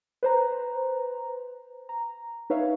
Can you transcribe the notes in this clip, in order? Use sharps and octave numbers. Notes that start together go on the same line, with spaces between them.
B4 C5 A#5
A#5
D#4 B4 C#5 E5 F5